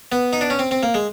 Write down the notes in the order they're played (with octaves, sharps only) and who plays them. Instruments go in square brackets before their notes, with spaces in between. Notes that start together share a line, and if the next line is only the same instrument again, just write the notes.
[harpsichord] B3
D#4
D4
C#4
C4
C4
A#3
G#3